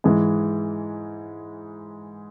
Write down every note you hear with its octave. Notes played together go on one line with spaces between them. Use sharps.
G#2 E3 G#3